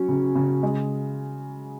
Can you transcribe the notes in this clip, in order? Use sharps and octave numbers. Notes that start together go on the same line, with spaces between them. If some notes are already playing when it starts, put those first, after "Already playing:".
Already playing: F#3 C#4
C#3
C#3
G#3